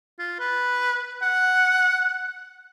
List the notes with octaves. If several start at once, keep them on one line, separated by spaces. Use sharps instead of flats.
F4
B4
F#5